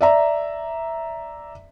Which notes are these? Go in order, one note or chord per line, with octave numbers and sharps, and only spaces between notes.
D5 E5 A#5